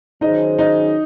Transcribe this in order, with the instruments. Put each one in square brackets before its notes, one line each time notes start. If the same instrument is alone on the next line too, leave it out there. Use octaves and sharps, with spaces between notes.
[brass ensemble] D#3 F#3 C#4 G#4 C5 [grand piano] D#4 D#5
[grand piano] D#4 D#5